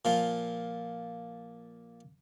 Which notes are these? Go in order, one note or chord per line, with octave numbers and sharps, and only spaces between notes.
A#2 F3 F4